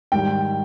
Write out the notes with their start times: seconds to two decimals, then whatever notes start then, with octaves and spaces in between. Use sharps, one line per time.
0.12 G#2 D#3 G3 G5